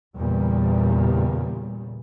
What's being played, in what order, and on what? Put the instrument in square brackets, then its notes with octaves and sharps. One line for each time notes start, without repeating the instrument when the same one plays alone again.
[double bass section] E2 A#2 C#3 G3